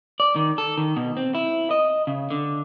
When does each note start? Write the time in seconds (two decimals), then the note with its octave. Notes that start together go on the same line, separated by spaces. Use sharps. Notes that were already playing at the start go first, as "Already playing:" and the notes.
0.20 D5
0.36 D#3
0.58 A4
0.78 D#3
0.97 B2
1.17 C4
1.35 E4
1.71 D#5
2.07 C#3
2.30 D3